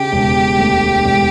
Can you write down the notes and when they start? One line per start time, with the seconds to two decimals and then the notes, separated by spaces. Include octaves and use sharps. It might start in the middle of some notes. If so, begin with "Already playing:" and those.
Already playing: C#3 G4
0.12 E1
0.59 D2
1.05 E1